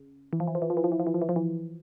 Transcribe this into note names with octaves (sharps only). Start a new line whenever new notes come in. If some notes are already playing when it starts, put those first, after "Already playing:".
Already playing: C#3
E3
F3
E3
F3
E3
F3
E3
F3
E3
F3
E3
F3
E3
F3
E3